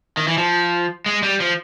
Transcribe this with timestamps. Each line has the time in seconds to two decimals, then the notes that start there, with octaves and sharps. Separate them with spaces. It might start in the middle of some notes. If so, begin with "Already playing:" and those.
0.17 D#3
0.28 E3
0.38 F3
1.06 G#3
1.23 G3
1.40 F3